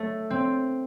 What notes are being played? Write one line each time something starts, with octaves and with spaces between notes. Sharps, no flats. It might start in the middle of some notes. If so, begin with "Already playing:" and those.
Already playing: A3
C4